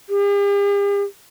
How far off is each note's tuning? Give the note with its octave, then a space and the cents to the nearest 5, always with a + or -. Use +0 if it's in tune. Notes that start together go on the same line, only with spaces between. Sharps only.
G4 +45